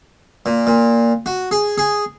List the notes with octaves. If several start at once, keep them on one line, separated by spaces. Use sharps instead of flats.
A#2
A#2
F#4
G#4
G#4